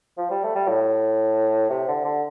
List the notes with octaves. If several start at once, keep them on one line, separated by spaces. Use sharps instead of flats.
F3
G3
A3
G3
A2
C3
D3
D3